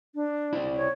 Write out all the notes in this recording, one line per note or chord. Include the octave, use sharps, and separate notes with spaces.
D4
E4 C5 D5
C#5